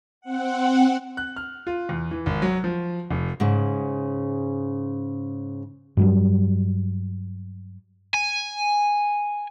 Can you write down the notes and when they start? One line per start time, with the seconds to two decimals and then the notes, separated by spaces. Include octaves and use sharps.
0.21 C4 F#5
1.17 F#6
1.36 F6
1.67 F4
1.89 E2
2.11 E3
2.26 G#1
2.42 F#3
2.64 F3
3.11 F1
3.40 G#2 C#3
5.97 G2 F#3 G3
8.14 G#5